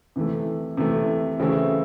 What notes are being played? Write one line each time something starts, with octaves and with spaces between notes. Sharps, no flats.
C3 E3 A3
C3 E3 A3
C#3 E3 A3 C4 E4